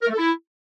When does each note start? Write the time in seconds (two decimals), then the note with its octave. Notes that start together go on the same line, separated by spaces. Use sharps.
0.02 A#4
0.07 A3
0.12 A4
0.18 E4